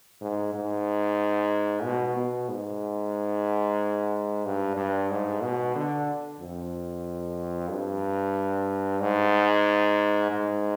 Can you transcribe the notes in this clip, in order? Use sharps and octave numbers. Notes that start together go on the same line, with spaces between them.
G#2
G#2
B2
B2
G#2
G2
G2
G#2
B2
D3
F2
G2
G#2
G#2